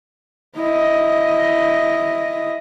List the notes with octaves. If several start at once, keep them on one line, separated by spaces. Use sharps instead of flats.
E4 D#5